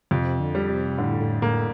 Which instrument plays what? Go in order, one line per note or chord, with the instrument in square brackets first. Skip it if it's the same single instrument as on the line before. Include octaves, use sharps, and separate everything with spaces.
[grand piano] F2 [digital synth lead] C3
[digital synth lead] D3
[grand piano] G3
[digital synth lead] C3
[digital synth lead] A2 [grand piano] D3
[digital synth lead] A2
[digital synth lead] A2 [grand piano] A#3